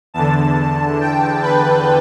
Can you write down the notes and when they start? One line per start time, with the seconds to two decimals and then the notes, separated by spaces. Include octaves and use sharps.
0.14 E2 D3 A5
1.01 G5
1.43 B4